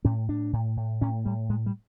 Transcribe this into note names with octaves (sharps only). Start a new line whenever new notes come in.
A2 C#4
A2 D4
A2
A2
A2 C#4
A2 G3
A2 G#3
G3